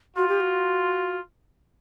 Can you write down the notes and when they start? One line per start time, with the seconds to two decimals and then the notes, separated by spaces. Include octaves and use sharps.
0.16 F4 F#4
0.28 G4
0.40 F#4